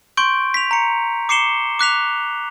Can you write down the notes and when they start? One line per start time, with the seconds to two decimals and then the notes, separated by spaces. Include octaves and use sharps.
0.17 C6 C#6 G6 D7
0.54 B6 F7
0.71 A#5 C#7
1.29 D6 C7 C#7 E7 G7
1.79 D6 F#6 B6 F7